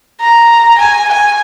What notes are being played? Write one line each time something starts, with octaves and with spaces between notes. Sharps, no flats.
A#5
G#5
G#5